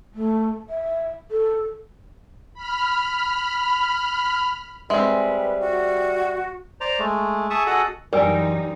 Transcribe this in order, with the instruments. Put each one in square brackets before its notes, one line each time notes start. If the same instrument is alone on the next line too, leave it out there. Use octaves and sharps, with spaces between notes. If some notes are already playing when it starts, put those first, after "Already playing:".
[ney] A3
E5
A4
[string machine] B5 F6
[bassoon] G3 [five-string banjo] G#3 C4 [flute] B4 [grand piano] E5
[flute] F#4
[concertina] C5 D5 A#5
G#3 A3
G#4 E5 A5 C#6 D#6
F#4 G#4 A4 D#5 F#5 D#6
[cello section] F#2 E3 D#4 [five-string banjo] G3 [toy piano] A#4 G#5